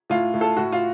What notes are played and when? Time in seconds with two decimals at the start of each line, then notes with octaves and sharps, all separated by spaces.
0.10 A2 F4
0.34 A2
0.41 A4
0.57 A2 F#4
0.72 F4